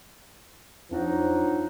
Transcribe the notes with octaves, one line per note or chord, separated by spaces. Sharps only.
F2 F3 F#3 D4 D#4